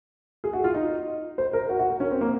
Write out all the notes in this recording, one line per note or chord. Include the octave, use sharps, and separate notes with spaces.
G#4
F#4
F4
D#4
C5
A#4
F#4
F#4
A#4
C#4
C4
A#3